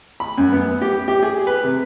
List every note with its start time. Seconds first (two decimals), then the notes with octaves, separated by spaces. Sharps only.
0.20 B5
0.38 F#2
0.53 B3
0.82 G4
1.08 G4
1.23 G#4
1.47 B4
1.64 C3